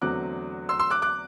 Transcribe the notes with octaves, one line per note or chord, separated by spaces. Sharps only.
E2 D3 F#3 A3 C4 D6 F#6
C6 E6
C6 E6
D6 F#6
D6 F#6